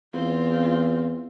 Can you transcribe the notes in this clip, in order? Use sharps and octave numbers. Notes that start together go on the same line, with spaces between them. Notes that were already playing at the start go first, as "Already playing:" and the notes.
E2 C4 F4